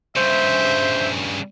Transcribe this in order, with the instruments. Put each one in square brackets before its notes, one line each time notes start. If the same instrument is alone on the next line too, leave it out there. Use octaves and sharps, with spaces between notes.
[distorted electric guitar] G2 C#3 [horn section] C5 E5